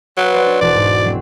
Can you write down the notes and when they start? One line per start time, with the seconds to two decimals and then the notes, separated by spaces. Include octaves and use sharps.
0.18 F#3 B4
0.33 C5 D5 F#5
0.46 D4
0.61 E1 F#4 D5 A5
0.75 G#2
1.04 F#3 C4